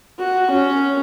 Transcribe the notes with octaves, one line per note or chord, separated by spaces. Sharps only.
F#4
C#4